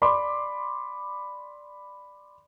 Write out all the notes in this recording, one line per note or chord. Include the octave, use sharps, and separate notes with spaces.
D5 B5 C6 D6